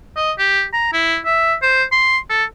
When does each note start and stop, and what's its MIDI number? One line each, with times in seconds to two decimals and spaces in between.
0.17 0.32 75
0.38 0.64 67
0.73 0.91 82
0.93 1.18 64
1.25 1.54 76
1.62 1.84 72
1.92 2.18 84
2.30 2.44 69